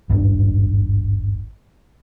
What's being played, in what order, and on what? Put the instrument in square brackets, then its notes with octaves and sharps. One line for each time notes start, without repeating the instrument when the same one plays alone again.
[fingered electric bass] D#1 G#1 G2 D4